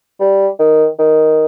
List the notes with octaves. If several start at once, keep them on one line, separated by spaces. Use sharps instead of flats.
G3
D#3
D#3